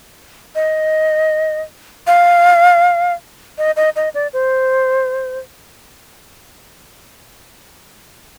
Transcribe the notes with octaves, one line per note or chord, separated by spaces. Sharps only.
D#5
F5
D#5
D#5
D#5
D5
C5